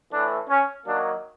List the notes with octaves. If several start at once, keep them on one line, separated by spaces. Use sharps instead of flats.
A2 E3 A3 D4
C#4
D#3 F#3 A#3 D4